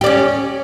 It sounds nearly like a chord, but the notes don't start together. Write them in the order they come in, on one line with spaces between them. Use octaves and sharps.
G4 D5 C#4